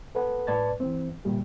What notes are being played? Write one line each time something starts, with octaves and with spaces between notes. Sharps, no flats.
A4 B4 F#5
A2 B4 D5 A5 G#6 A6
E3 C4
A#2 D3 G3 G4